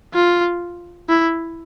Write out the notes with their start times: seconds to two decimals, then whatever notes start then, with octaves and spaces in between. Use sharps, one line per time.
0.14 F4
1.09 E4